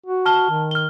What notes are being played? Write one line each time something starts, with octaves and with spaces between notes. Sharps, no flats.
F#4
A5 F6 G7
D#3
F6 G7